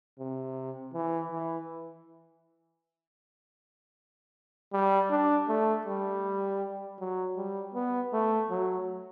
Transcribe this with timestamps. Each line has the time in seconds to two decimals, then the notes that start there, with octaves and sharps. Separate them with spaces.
0.19 C3
0.94 E3
1.31 E3
4.73 G3
5.11 D4
5.48 A3
5.85 G3
7.00 F#3
7.37 G3
7.74 B3
8.13 A3
8.50 F#3